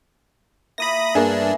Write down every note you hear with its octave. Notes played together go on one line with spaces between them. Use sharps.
A#3 E4 F4 B5 D#6 A#6
G2 E3 A#3 B3 D4 E4 G#4
A4